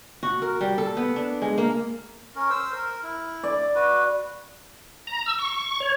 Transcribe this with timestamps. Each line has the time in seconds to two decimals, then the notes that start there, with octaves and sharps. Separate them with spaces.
0.23 F#4
0.42 A#4
0.61 G3
0.78 A4
0.97 B3
1.16 D4
1.42 G#3
1.58 A#3
2.36 C#4 A#4
2.51 C5 E6
2.72 A#4
3.03 E4
3.43 D5
3.75 F#4 B4
5.07 A#5
5.26 E6
5.39 C#6
5.80 C#5